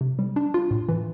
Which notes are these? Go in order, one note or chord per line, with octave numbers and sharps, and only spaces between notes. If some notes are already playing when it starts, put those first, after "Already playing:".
C3
G3
D4
F4
A2
E3